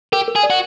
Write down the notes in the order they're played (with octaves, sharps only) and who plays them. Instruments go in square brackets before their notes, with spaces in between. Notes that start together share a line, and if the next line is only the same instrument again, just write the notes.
[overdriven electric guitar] G4 [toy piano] A#4
[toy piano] A#4
[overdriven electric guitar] G#4
[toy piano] D5
[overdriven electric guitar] F#4